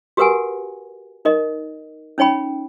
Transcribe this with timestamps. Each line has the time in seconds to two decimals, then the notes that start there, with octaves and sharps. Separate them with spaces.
0.17 F#4 G4 A#4 B4 F#5 G#5
1.25 D#4 A#4 D#5
2.18 C#4 D#4 C#5 G5 B5